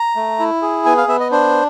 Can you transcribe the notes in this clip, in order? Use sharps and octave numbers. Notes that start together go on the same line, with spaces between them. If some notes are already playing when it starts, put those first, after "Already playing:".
Already playing: A#5
A3
E4
G#4
B3 G#5
F5
B3 E5
D#5
D4 C5